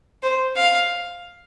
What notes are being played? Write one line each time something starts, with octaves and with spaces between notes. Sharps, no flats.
C5
F5